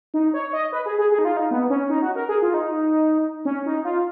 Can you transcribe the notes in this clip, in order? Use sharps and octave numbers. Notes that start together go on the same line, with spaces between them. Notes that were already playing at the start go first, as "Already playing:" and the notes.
D#4
C#5
D#5
B4
G#4
G#4
G#4
D#4
F4
D#4
B3
C#4
D#4
F#4
A#4
G#4
F4
D#4
C#4
D#4
F4